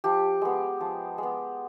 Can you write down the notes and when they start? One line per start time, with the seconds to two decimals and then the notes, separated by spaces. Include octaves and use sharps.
0.04 F3 G4
0.42 G#3 B3
0.81 F3
1.18 G#3 B3